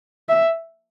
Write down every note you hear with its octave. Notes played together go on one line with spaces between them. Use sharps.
E5